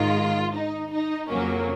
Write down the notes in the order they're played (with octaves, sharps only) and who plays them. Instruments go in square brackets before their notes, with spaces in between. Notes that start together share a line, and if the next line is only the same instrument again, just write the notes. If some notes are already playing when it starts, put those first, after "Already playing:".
Already playing: [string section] G#2 D#3 G#3 F4
D#4
D#4
F2 C#3 F#3 A#3 C#4